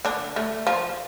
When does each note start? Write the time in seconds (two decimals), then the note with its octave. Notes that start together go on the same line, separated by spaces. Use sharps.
0.05 D3 D4
0.36 A3
0.67 F3